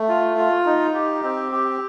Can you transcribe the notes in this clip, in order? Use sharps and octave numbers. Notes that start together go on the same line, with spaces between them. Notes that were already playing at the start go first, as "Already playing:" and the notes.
Already playing: A3
F4
F4
D#4
G4
C4
G4